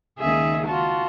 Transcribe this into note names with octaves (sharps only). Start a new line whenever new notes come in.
C#2 D#3 A#3 G#4 E5
F4 F#4 A5